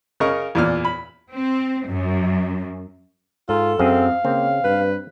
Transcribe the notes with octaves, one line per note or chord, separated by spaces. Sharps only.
C#3 A#4 D#5 C#6
E2 A#2 D5 F6
B5
C4
F#2
G#2 F4 A4
F#2 C4 G#4 F5
C#3 A#3 C4
G2 B4